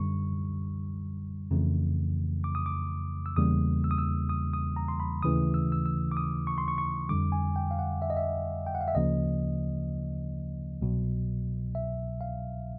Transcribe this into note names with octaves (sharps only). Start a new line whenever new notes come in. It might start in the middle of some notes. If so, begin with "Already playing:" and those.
Already playing: F#2 D3 G3 C#6
F2 C#3 E3 A3
D6
D#6
D6
E6
E2 C#3 E3 G3 A#3 D#6
E6
D#6
E6
D#6
D#6
A#5
C6
B5
D#2 C#3 E3 A3 D#6
E6
E6
E6
D6
D#6
C#6
C6
C#6
C#6
F2 D3 G3 D6
G#5
G5
F5
F#5
E5
D#5
E5
G5
F#5
F5
E5
D2 C#3 F3 A#3 D#5
C2 B2 F#3
E5
F5